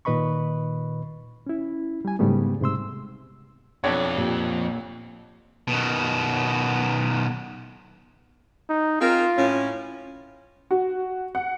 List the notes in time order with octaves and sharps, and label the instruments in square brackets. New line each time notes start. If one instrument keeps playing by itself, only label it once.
[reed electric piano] A#2 D#3 B4 D#5 B5 C#6
C#4 E4
G3 G#5
G#2 C#3 G3 A3 B3
G#2 C3 C6 E6
[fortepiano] B1 D4 C#5 [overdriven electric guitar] F2
[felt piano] A#2 G4
[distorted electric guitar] B2 D#3
[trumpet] D#4
[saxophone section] C4 G#4 A#4 [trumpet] F4
[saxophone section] A2 C#4
[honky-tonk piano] F#4
F#5